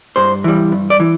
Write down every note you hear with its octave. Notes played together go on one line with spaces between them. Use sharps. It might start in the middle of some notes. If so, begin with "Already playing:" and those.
G2 C5
E3 G3
G2
D5
E3